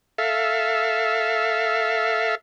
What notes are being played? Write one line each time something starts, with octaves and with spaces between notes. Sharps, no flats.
A4 E5 F5